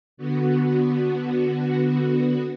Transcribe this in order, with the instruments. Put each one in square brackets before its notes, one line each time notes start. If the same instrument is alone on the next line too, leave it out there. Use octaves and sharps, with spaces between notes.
[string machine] D3 B3 F#4